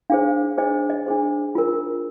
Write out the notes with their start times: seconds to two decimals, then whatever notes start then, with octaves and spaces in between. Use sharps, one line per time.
0.10 D4 G#4 C5 F5
0.58 D4 G#4 C5 D#5
0.90 D#5
1.06 D4 G#4 C5
1.55 F4 A#4